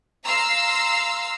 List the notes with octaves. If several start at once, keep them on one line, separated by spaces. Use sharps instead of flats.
F5 A#5 C6 E6